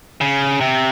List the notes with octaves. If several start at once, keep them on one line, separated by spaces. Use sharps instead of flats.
C#3
C3